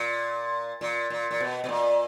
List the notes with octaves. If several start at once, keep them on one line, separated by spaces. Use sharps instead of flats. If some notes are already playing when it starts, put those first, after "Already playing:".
Already playing: A#2
A#2
A#2
A#2
B2
B2
A#2